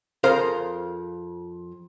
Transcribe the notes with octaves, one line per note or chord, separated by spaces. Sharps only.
F2 G#4 A#4 C5 F5